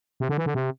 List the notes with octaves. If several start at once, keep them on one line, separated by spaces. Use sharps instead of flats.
C3
D3
E3
D3
C3